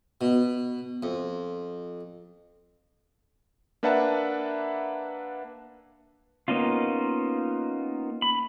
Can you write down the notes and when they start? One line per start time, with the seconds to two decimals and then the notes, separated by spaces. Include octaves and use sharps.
0.21 B2
1.03 F2
3.83 A#3 D4 B4 E5 F#5 A5
6.48 A#3 B3 C#4 D#4 F4
8.22 B5